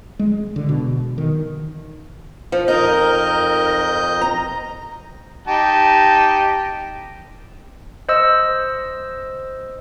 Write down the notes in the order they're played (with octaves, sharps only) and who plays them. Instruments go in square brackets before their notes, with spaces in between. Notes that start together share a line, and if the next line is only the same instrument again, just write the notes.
[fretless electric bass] G#3
D3
B2
D#3
[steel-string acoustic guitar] F3
[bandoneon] F2 D#5 G6 [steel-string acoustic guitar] D#4 [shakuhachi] A#4
[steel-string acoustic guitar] A#5
[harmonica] D#4 G4 A5
[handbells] C5 D#5 E6